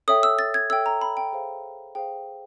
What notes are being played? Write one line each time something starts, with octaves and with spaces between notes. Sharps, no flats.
A4 C#5 E5 G5 D#6
E6
A6
G#6
A4 C#5 E5 G5 E6
A#5
B5
G5
G#4 C5 F5
G#4 C5 F5 G5